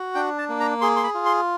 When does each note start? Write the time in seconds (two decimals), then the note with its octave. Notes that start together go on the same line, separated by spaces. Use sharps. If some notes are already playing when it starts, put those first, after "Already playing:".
Already playing: F#4
0.15 D4 G5
0.38 A5
0.49 A#3
0.60 A#5
0.81 G#4 C6
0.96 C6
1.03 B5
1.14 F4
1.26 C6